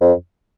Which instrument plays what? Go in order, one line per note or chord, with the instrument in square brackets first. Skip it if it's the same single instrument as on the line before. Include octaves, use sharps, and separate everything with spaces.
[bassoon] F2